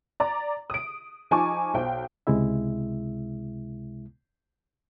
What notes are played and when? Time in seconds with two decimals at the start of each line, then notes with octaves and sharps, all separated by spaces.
0.20 D5 A#5
0.70 D#6 D7
1.31 F3 D#4 G#5 A5 C#6 D6
1.74 B1 C5 G5
2.27 C#2 C3 G#3 E4 E5